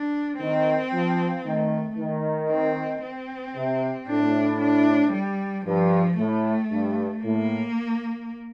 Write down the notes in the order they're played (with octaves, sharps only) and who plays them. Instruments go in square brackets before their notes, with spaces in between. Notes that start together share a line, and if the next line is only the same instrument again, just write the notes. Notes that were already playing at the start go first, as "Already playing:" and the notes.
Already playing: [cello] D4
[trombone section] D#3 [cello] C4
[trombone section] F3
[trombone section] D#3 [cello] A3
[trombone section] D#3
[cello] C4
C4
[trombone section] C3
[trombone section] A2 [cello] D4
[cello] D4
G3
[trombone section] G2 [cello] F3
[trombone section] A2 [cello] A3
[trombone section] G2
[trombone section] A2 [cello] A#3